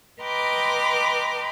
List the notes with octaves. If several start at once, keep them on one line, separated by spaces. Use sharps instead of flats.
B4 D#5 G5 A#5 C6 D6